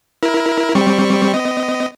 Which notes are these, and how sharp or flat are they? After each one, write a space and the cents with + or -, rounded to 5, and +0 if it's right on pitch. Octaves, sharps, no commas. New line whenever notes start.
E4 -5 A#4 +20
G3 +5 C4 +0 C#6 +0
B3 +45 D#5 +0